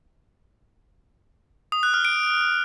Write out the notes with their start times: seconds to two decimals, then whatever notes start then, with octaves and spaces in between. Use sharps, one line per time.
1.72 D#6
1.83 F#6
1.94 F6
2.05 D7